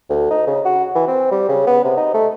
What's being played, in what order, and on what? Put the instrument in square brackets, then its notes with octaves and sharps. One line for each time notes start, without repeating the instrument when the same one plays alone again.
[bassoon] D2
D#4
C#3
F#4
E3
C4
G3
C#3
B3
C3
D#4
A3